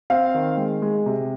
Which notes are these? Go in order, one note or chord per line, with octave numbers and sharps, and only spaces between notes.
C4 F5
D#3
G#3
G#3
C3